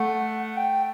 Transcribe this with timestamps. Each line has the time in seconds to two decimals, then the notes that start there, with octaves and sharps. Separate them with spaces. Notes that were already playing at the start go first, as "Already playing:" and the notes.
Already playing: A3 F#5
0.57 G5